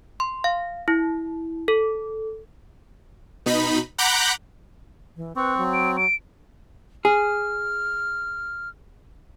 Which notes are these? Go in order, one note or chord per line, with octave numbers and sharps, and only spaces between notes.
C6
F5
E4
A4
B2 D#4 B5
F#5 A#5 B5 D6 F#6 G6
E3
C4 B4 C#6
F#3
D7
D7
G#4 F6